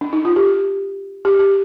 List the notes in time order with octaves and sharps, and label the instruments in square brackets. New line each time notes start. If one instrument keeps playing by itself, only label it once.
[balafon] D4
D#4
F4
G4
G4
G4